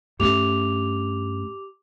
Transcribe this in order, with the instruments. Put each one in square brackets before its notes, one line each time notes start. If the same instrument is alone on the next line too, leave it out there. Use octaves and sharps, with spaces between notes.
[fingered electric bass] G2 A3 C#4 [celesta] G4 D6 F7